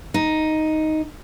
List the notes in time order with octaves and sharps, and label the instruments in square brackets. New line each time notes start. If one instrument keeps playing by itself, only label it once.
[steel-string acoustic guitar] D#4